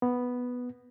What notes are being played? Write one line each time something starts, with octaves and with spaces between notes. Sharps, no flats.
B3